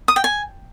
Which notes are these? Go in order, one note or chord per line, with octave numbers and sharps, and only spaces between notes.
D#6
G5
G#5